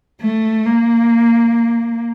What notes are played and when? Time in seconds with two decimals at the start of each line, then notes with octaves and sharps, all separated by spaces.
0.22 A3
0.66 A#3